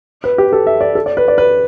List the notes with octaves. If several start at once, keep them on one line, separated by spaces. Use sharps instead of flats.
B4
G4
A4
E5
D5
A4
D5
B4
D5
B4